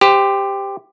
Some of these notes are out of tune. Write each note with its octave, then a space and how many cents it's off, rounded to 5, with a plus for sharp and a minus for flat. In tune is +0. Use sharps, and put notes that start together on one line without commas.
G4 +10 C5 -20